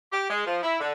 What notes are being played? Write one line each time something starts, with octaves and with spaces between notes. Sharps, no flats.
G4
G#3
F3
E4
D3